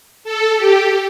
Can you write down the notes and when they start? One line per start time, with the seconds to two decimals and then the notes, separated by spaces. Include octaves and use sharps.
0.24 A4
0.57 G4